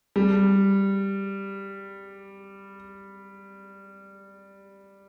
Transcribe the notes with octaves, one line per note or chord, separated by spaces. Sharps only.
G3